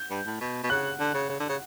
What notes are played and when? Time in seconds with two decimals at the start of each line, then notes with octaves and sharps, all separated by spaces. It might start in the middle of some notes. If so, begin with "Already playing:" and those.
Already playing: G6
0.10 G2
0.26 A2
0.41 B2
0.63 B2
0.70 C#3 F#6
1.00 D3
1.14 C#3
1.29 C#3
1.40 D3
1.49 C#3